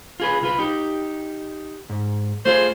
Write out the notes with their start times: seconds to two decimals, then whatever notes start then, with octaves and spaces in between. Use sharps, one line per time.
0.20 F4 G#4 B4
0.41 C2 F4 B4
0.59 D#4 G4
1.89 G#2
2.45 A3 F4 G#4 C5